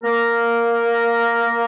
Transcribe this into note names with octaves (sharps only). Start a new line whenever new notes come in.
A#3 A#4